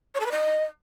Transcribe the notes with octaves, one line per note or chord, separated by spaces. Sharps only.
C#5
A4
B4
D#5